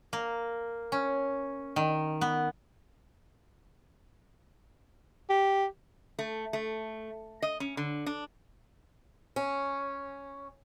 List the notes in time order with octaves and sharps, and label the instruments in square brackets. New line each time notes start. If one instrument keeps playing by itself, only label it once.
[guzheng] A#3
C#4
D#3
B3
[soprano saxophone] G4
[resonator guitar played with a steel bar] A3
A3
D#5
C#4
D3
D4
[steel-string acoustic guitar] C#4